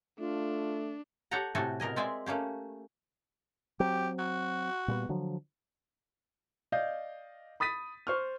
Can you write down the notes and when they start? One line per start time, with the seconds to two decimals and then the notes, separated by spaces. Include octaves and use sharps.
0.19 A3 D4 F4
1.31 G4 A4 C#5 F#5 G5 A#5
1.55 A2 C3 F#4 G4 A4 G#5
1.80 B2 A#4 D#5 G#5
1.96 G#3 C4 D5 E5 G#5
2.26 A3 A#3 C#4 G4
3.80 F#3 C4 G4
4.19 F#4
4.88 A#2 G3 B3
5.09 D3 F3 F#3
6.72 D5 D#5 F5 G6
7.60 B5 D#6 A6 B6 D#7
8.07 C5 C#6 F6